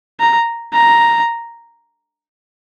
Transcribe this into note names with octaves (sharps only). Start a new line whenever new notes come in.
A#5
A#5